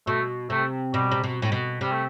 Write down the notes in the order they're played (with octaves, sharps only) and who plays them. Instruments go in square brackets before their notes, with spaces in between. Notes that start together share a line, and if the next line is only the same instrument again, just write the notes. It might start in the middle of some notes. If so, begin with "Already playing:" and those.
[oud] B2 [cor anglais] A3
[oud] C3 [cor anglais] A3
[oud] B2 [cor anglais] G3
[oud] C3
B2
A2
B2
[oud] C3 [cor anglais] G3
[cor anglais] A3